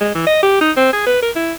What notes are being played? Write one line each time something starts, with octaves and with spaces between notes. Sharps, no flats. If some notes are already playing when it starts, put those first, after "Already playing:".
G#3
E3
D#5
G4
D#4
C4
G#4
B4
A#4
E4